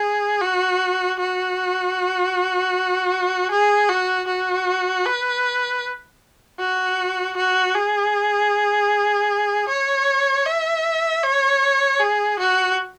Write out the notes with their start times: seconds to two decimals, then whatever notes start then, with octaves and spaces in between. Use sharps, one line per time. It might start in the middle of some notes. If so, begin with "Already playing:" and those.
Already playing: G#4
0.41 F#4
1.19 F#4
3.51 G#4
3.89 F#4
4.28 F#4
5.05 B4
6.59 F#4
7.37 F#4
7.75 G#4
9.69 C#5
10.45 E5
11.23 C#5
12.00 G#4
12.39 F#4